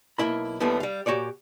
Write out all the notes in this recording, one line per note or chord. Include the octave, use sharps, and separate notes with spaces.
B1 F2 A#3 E4 B5
D#2 D3 E3 G3 A3 B3
G3 F5
A#2 F#4 G4 C#5 D5